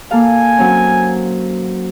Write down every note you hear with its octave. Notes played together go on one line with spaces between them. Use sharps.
A#3 A4 F5 G#5
F#3 C4 C#4